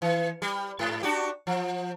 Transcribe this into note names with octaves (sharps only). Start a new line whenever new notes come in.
E3
G3
G#2
D4 F#4 G4
F3